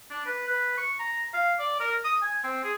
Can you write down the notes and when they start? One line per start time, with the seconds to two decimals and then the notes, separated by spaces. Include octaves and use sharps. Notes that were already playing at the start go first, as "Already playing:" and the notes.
0.10 D4
0.26 B4
0.48 B4
0.77 C#6
1.00 A#5
1.34 F5
1.59 D5
1.80 A#4
2.05 D#6
2.22 G#5
2.44 C4
2.64 G#4